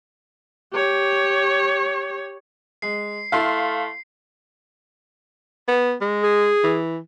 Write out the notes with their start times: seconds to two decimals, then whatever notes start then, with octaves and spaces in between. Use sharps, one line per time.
0.73 G4 C#5
2.82 G#3 C7
3.32 A3 E4 A4 F5 C6
5.68 B3
6.01 G#3
6.23 G#4
6.64 E3